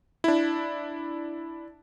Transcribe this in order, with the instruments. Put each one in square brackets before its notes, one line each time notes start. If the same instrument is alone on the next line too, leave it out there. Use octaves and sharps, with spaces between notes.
[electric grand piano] D4 E4